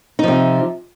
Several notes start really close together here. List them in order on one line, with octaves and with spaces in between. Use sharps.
D#4 F3 C3